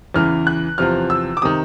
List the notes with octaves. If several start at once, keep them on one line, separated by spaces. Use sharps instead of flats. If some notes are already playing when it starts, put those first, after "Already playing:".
E2 C#3 E3 F6
F#6
E2 C3 F3 F6
E6
D6
C3 D#3 D#6